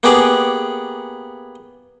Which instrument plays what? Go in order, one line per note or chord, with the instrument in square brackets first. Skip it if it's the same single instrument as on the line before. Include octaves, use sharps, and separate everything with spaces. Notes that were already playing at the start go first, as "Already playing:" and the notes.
[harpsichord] A#3 B3 C#4 G4 G#4 D5